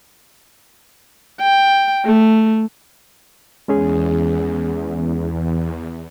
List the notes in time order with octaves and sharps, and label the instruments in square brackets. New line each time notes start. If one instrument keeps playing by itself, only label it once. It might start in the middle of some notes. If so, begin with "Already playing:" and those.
[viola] G5
A3
[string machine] E2 [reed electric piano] G#3 C#4 G#4